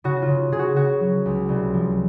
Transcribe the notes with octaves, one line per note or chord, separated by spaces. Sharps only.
C#3 F#4
F4
C#3
C#3 G#4
F#4
C#3 F#4
F#3
C#2
C2
F3